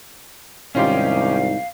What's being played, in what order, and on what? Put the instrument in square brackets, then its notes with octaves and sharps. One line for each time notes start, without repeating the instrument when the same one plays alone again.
[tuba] C2 [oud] G#2 D#3 F4 [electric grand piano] C#4 D#4 G4 [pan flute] F5